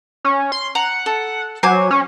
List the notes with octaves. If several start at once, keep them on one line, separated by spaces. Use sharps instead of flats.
C#4
C6
F#5 A#5
A4
F#3 C5 G#5 D6
C#4